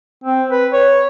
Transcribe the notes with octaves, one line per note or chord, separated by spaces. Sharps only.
C4
B4
C#5